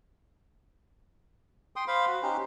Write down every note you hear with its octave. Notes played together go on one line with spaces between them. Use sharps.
G5 C6 D#6
C5 F5 B5
F#4
C#4 D#4 G4 C5